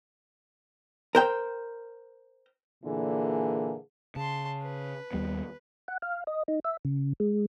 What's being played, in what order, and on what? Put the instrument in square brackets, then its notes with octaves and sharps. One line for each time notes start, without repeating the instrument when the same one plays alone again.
[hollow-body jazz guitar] A#4 C5 G5
[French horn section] A#2 D3 E3 A#3 G#4
[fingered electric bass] C#3 [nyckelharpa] A5 C6
[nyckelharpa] B4
[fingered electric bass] D#2 G3 B3
[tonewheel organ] F#5
F5
D#5
D#4
E5
C#3
G#3